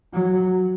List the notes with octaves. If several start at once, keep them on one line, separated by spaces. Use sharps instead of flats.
F#3